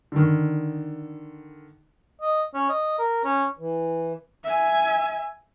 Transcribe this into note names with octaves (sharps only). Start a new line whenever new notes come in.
D3 D#3
D#5
C#4
D#5
A#4
C#4
E3
E5 G#5